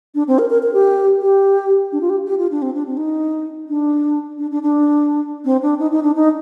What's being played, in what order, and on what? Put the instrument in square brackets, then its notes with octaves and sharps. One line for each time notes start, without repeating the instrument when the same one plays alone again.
[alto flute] D4
C4
A#4
A#4
A#4
G4
G4
D4
F4
G4
G4
F4
D4
C4
D4
C4
D#4
D4
D4
D4
D4
C4
D4
D#4
D#4
D4
D#4